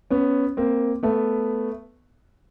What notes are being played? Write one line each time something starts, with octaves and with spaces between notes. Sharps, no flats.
B3 C#4
A#3 C4
A3 B3